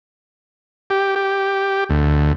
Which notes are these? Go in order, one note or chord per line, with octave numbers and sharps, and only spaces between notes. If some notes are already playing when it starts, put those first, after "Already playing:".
G4
G4
D2